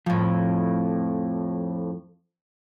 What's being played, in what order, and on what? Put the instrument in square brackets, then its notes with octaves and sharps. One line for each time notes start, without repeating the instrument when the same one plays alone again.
[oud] F2 A2 [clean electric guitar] F3